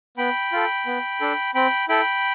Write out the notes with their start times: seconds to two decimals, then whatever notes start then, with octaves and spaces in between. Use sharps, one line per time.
0.17 B3 G5 B5
0.53 F4 A4
0.86 B3
1.21 D4 A4
1.55 C4 G5 B5
1.89 E4 A4 G5 B5